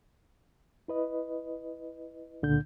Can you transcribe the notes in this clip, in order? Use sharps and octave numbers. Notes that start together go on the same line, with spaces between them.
E4 B4 D#5
C#2 A#2 D3 D4 G6